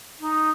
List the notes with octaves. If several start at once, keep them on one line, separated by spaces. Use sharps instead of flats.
D#4